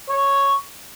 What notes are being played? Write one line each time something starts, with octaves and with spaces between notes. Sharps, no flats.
C#5